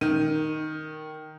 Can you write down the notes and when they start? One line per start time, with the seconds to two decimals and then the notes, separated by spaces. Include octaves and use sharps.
0.01 D#3 D#7